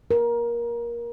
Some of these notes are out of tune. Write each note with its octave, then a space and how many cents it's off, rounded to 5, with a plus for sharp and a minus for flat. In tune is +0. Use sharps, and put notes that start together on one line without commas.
A#4 +20